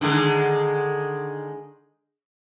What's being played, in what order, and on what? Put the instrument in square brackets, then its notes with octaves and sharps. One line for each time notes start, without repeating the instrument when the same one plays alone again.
[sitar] D3 D#3 G#3